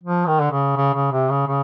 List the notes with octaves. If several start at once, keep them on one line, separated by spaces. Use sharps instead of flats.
F3
D#3
D3
C#3
C#3
C#3
C3
C#3
C#3